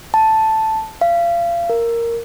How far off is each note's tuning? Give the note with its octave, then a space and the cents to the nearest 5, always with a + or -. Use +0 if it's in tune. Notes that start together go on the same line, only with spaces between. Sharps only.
A5 +0
F5 -30
A#4 -5